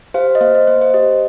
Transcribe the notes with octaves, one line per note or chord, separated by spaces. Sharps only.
G4 C5 F5
D#5
A#3 C5 F5
D#5
A#3 C5
C5
G4 D#5